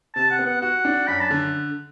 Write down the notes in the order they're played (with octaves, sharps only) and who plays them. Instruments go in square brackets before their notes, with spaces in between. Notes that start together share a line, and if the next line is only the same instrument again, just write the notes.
[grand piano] C3 [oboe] A5
[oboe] F#5
[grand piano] B3
[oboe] F#5
[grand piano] F#4 [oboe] F#5
[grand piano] D4
[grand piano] F#2 [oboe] B5
[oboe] A5
[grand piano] D3